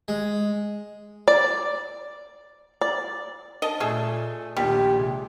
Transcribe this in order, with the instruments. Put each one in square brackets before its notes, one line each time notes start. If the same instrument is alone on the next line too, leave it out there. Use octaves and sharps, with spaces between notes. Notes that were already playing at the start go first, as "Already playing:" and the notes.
[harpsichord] G#3
[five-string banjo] D5
D5
[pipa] D#5 A5
[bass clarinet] A#2 [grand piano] A3 [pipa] G#4 E5
[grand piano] A#1 D#2 A#2 [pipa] G3 [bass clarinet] G4
[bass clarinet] C3 [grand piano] G#3